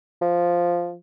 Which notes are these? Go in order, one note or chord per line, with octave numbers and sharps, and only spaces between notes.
F3